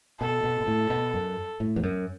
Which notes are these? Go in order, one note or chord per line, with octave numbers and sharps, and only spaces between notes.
B2 A4
B2
B2
A2
B2
F#2
A2
E2
F#2